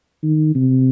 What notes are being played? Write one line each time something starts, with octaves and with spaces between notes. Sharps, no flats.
D#3
C3